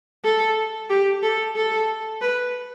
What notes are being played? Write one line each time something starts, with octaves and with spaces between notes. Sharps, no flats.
A4
G4
A4
A4
B4